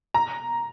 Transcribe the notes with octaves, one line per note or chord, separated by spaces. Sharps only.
A#5